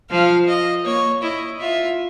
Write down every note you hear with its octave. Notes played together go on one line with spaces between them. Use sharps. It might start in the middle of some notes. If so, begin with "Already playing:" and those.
F3 F5
D#5
A#3 C#5
E4 D#5
F4 E5